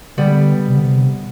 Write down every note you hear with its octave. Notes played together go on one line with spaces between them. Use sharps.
D3 G3 B3
C3
D3
C3